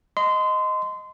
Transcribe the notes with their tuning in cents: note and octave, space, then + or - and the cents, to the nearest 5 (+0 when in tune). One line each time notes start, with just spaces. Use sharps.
D#5 +0 C6 -25